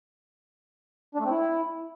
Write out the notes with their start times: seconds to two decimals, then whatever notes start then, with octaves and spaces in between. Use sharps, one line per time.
1.15 D4
1.20 A3
1.25 C4
1.30 E4